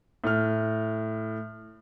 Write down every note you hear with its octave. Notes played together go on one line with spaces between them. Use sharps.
A2 F6